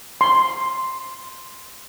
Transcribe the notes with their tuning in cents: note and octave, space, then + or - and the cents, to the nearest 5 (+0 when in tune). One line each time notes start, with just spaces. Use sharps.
C6 +0